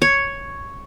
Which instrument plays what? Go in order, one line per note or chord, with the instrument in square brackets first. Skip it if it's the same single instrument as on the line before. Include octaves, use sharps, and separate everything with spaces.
[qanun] C#5